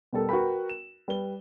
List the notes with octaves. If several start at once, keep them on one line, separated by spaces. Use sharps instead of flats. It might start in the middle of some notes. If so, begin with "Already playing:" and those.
B2 G3 A4 A#4
F#4 A#4 B4 G5 B5
E7
G3 B4 G7